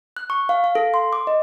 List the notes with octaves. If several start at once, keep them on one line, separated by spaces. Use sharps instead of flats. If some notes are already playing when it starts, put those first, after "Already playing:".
F#6
C#6
F5
F5
A4
C6
D6
D#5